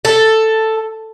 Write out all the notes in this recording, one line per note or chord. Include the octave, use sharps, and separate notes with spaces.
A4